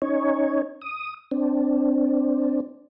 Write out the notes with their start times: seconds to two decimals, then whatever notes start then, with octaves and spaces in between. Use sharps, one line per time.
0.02 C#4 D#4 C#5
0.81 D#6
1.31 C4 D4